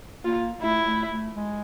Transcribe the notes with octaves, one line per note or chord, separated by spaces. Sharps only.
A#3 F4
A3 E4
A3
A3
G#3